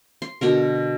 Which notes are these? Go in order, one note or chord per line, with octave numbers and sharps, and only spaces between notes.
C6
B2 D3 A#4